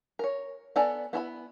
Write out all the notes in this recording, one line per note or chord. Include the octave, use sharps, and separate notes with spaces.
A#4 C#5
B3 A4 D5 G#5 A#5
B3 E4 A#5 B5